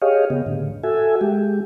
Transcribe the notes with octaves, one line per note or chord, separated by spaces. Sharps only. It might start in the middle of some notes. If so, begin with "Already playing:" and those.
G4 G#4 C#5 D#5 F5
C#3 B3
A2 D3
F#4 A4 E5 G#5
G#3 G4